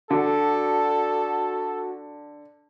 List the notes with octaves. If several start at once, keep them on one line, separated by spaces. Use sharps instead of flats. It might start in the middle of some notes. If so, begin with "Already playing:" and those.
D3 F#4 A4